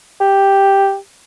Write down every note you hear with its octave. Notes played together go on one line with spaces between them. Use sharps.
G4